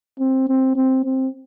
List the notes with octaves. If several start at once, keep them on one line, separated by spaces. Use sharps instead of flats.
C4
C4
C4
C4